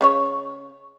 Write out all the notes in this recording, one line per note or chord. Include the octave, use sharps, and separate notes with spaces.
C#3 C#4 C#5